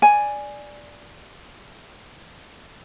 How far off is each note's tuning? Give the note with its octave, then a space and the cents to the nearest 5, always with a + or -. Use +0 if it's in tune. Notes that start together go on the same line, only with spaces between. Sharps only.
D5 +0 G#5 +0